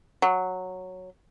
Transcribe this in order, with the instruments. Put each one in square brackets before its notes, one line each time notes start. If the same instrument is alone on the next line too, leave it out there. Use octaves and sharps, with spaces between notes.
[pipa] F#3